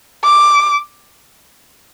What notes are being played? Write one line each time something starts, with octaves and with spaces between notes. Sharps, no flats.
D6